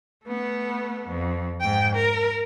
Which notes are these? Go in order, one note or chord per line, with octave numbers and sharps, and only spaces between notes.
A3 B3
F2
G#2 G5
A#4